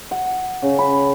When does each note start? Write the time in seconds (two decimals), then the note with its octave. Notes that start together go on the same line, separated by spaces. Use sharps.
0.11 F#5
0.62 C#3
0.79 B5